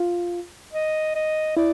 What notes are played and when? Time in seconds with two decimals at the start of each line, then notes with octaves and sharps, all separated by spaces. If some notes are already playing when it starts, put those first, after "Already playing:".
Already playing: F4
0.73 D#5
1.15 D#5
1.57 E4 D5